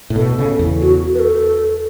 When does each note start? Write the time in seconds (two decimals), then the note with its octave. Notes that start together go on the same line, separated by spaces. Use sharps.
0.10 A2
0.16 B2 A4
0.38 C#3
0.59 E2
0.82 F#4
1.14 B4
1.19 A4